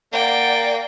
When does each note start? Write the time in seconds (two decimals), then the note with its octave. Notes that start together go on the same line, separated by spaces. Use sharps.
0.13 A#3 D5 F#5 G5